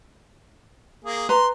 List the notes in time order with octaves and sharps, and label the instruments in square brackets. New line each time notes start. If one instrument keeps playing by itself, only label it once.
[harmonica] A#3 G#4
[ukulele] B4 A#5 [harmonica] C6